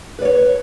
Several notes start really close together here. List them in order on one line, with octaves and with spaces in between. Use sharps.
B4 D5 C#5